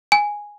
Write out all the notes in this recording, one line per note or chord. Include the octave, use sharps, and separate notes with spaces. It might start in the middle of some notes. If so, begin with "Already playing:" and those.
G#5